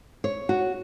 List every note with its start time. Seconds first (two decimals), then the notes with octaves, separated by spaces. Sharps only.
0.24 C#5
0.49 F#4